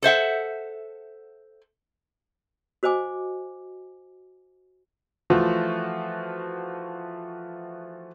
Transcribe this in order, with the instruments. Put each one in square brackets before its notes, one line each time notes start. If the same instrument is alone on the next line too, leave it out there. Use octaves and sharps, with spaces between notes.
[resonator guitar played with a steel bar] A4 C5 E5 F#5
[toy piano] F#4 C5 D#5 G#5 D6
[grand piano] E3 F3 A3 F4 F#4